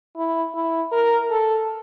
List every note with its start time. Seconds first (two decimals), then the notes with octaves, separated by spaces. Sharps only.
0.16 E4
0.54 E4
0.92 A#4
1.30 A4